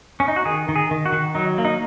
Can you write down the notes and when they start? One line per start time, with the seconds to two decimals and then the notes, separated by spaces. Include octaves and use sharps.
0.20 C#4
0.28 D#4
0.36 F#4
0.45 D#3 G#4
0.69 D#3
0.76 G#4
0.91 D#3
1.05 F#4
1.12 D#3
1.35 F#3 D#4
1.58 A#3
1.65 D#4